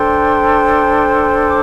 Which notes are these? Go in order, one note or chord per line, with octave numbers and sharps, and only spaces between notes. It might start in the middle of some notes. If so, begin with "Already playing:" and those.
Already playing: D4 A4 C5 G5 C6
D6